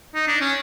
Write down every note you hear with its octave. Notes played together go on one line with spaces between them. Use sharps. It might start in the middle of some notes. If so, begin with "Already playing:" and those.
D#4
D4
C#4